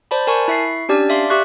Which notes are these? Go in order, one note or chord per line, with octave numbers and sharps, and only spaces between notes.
C5 D5 A5 B5
A#4 G#5 A5 C#6
E4 E5 C#6 C7
C#4 D4 G4 D5 A5 F6
D5 E5 F5 C6 D6
G4 E5 C#6 F#6